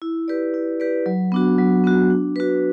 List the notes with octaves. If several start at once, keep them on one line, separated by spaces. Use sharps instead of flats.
E4
G4 B4 D5
E4
G4 B4 D5
F#3
B3 D4 F#4
F#3
B3 D4 F#4
D4
F#4 B4